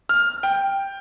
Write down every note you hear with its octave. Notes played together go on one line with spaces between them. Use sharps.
F6
G5